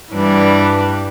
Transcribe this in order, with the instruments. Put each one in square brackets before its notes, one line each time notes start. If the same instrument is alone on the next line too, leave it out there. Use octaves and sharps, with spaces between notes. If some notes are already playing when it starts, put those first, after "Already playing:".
[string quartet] G2 E3 G3 D4